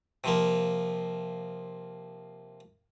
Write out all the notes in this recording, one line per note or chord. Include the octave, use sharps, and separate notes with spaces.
C3 F3 A#3